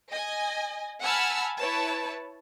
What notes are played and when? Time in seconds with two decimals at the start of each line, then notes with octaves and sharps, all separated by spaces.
0.12 D#5 G#5
1.03 F#5 G#5 A5 B5 E6 F6
1.60 E4 B4 C#5 A5